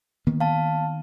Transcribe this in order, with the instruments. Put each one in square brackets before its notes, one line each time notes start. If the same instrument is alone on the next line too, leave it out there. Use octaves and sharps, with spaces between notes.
[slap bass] D#3 A#3 B3
[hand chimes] F5 A5